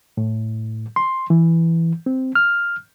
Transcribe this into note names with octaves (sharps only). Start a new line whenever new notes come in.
A2
C6
E3
C4
F6